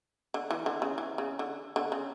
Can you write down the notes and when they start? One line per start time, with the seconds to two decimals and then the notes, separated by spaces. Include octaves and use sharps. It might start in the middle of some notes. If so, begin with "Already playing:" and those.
0.34 D3
0.51 E3
0.66 D3
0.82 C#3
0.98 E3
1.18 C#3
1.39 D3
1.76 D3
1.92 C#3